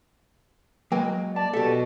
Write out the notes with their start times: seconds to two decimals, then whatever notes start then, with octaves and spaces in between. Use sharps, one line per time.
0.92 F#3 G#3 A#3 B4 D#5 G5
1.36 D5 E5 A5
1.53 B2 G4 A4 E5